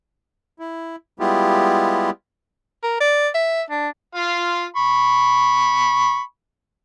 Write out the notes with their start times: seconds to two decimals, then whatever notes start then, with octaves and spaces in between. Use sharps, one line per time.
0.59 E4
1.19 G3 G#3 B3 E4 F4 G4
2.83 A#4
3.00 D5
3.35 E5
3.70 D4
4.15 F4 F5 C6
4.76 B5 C#6